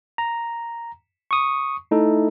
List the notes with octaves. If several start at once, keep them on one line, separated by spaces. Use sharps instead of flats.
A#5
C#6 D#6
A3 D#4 E4 A4